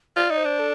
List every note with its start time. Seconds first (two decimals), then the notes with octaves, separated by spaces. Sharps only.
0.16 F4 D5
0.30 D#4
0.38 C5
0.45 D4
0.59 A4